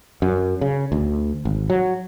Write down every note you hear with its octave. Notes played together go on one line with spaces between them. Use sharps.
F#2
C#3
D2
G#1
F#3